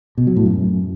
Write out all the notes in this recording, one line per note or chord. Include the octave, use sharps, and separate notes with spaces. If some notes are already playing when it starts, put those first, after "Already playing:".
B2
F#3
A2
F#2